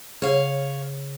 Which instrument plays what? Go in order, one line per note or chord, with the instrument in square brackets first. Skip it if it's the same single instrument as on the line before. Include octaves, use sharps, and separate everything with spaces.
[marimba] C#3 G#4 [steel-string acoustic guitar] C#5 F5